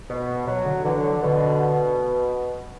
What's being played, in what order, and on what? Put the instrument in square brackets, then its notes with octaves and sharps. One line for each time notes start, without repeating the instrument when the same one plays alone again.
[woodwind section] B2
[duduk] B2 [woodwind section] F#3
[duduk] D3
[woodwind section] D3 [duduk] E3
[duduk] F#3
[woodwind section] B2 [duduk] D3